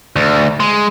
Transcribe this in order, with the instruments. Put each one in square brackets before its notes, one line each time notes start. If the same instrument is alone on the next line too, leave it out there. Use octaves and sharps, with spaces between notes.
[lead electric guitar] D2
G#3